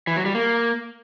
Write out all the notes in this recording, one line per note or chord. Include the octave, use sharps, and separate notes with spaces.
E3
F#3
G3
A#3